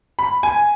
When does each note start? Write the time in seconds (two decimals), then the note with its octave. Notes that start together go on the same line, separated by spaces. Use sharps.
0.19 B5
0.43 G#5